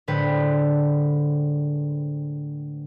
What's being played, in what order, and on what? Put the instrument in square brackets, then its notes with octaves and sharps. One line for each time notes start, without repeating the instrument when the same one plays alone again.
[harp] A2 D3 G#3 B4 C5 G5